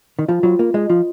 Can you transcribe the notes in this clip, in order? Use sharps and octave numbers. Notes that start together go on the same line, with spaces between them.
D#3
F3 F4
F#3 F4
A#3 F4
G#3 D#5
F3 F4